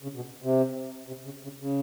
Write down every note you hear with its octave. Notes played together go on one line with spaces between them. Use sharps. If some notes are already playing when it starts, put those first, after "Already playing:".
C#3
B2
C3
C3
C#3
C#3
C#3